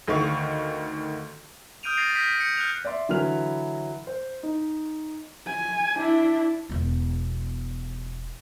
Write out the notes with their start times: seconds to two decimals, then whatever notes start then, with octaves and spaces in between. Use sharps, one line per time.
0.08 D2 D#3 F5 C#6
1.83 D#6 F6 G6 D7 D#7 F7
1.97 A6 A#6 C7 F7
2.15 F6 G6 A#6 B6 D#7
2.40 G6 C#7
2.57 F6 F#6 C#7 F7
2.85 D5 E5 C6
3.09 D3 E3 F#3 B4 F6 F7
4.07 C5
4.43 D#4
5.48 G#5
5.96 D4 E4
6.69 E1 B3